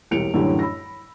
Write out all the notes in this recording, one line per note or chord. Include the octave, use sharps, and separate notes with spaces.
E1 C2 C#7 D7 F7
F#2 A2 D3 E3 F#3 G3
B5 E6 A#6